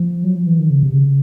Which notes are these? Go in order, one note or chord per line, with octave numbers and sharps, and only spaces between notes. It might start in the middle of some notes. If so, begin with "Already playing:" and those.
Already playing: F3
F#3
F3
E3
D#3
C#3
C3
C#3